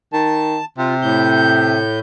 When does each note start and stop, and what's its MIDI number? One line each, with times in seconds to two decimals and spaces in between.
0.13 0.58 51
0.13 0.65 81
0.78 1.81 48
0.78 0.94 65
1.02 2.00 45
1.02 2.00 91